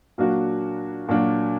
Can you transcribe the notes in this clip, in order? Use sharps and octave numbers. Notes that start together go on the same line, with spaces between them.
A#2 F#3 A#3 D4 F#4
A#2 F#3 A#3 D4 F#4